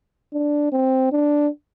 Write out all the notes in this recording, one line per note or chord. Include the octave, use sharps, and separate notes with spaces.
D4
C4
D4